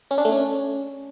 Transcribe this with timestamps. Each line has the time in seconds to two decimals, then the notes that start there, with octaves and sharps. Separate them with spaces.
0.11 C#4
0.18 D4
0.25 A3
0.32 C#4